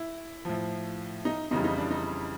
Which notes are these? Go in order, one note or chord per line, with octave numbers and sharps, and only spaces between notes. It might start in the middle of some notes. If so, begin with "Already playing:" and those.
Already playing: E4
A2 F3
D#4
F2 C#3 E3 G3 D#4
D#4
D4
D#4